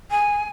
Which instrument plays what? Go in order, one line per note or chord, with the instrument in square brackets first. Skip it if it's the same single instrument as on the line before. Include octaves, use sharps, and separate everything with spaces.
[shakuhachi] G#5